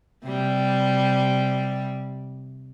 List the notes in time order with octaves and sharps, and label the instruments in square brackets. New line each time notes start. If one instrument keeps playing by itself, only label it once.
[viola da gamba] C3 G3